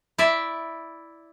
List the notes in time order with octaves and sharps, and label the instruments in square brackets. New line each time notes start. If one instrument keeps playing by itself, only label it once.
[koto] E4 D5 E5